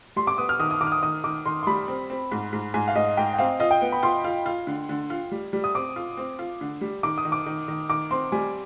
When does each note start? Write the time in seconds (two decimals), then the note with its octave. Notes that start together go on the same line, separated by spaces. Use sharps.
0.16 G3 C6
0.27 D6
0.38 B3 D#6
0.49 F6
0.59 D#3 D#6
0.71 D#6
0.81 D#3 D6
0.87 F6
0.92 D#6
1.03 D#3 D#6
1.24 D#3 D6
1.46 D#3 C6
1.63 C6
1.67 G3 B5
1.88 C4
2.10 C4
2.32 G#2
2.53 G#2
2.74 G#2 G#5
2.88 F5
2.95 G#2 D#5
3.17 G#2 G5
3.33 G5
3.38 C4 F5
3.60 F4 D#5
3.71 G5
3.82 B3
3.92 B5
4.03 F4 C6
4.24 F4
4.46 F4
4.67 D3
4.89 D3
5.10 F4
5.32 G3
5.53 G3
5.64 D#6
5.75 C4 D6
5.96 F4
6.17 C4
6.39 F4
6.61 D3
6.81 G3
7.03 D#3 D6
7.18 D#6
7.25 D#3
7.32 D6
7.46 D#3
7.68 D#3
7.89 D#3 D6
8.11 C4 C6
8.32 G3 G#5